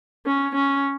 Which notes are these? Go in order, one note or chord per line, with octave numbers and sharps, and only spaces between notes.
C#4
C#4